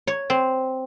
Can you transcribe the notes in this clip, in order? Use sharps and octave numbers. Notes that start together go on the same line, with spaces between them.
C#5
C4